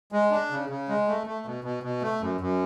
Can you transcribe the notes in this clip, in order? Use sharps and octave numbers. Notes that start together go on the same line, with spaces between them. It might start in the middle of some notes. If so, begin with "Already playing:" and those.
G#3
D4
C#3
C#3
G#3
A3
A3
B2
B2
B2
A3
F#2
F#2